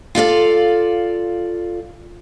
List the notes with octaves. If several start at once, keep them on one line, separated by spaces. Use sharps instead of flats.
F4 A4 D5 F5